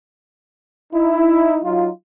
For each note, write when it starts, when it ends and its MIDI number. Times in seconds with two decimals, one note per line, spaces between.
0.93 1.59 63
0.93 1.59 64
1.64 1.89 54
1.64 1.89 63
1.64 1.89 65